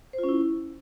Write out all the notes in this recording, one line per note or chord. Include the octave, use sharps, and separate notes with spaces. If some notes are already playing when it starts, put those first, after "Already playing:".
C5
F4
C#4
E4